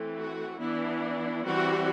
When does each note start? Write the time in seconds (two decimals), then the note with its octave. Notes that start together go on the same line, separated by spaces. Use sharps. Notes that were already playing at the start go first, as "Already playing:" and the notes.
Already playing: E3 A3 C4
0.17 F#4
0.59 E3 B3 D4 E4
1.44 E3 G3 C4 F#4